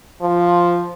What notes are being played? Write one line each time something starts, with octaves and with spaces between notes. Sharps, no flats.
F3